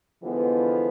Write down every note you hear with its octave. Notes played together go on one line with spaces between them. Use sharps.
D3 E3 F3 G#3 B3